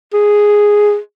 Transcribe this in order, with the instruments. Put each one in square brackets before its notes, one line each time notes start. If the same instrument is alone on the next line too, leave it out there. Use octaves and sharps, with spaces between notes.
[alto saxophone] G#4